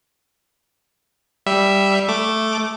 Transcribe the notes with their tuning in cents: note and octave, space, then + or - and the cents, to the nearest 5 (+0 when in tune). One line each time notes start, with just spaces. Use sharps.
G3 +0 E5 +0
A3 +0 D6 +0